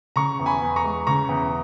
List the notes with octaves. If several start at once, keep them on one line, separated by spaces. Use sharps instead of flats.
C#3 A#5 C#6
E2
G#5 B5
E2
A#5 C#6
G#3
C#3 A#5 C#6
E2